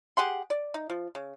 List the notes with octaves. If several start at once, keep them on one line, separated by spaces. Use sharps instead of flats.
G4 G#4 F#5 C6
D5
D#4
F3
C#3